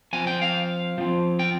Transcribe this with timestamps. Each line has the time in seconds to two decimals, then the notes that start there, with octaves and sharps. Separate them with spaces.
0.13 F3 C4 G#5
0.27 G5
0.42 F5
0.98 F3 C4
1.39 G5